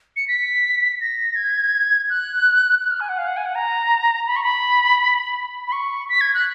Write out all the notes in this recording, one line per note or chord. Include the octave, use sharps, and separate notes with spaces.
C#7
B6
A#6
G#6
F#6
F#6
F6
G#5
F#5
F5
F#5
G#5
F#5
A#5
B5
C#6
B5
B5
C#6
B6
G#6
F#6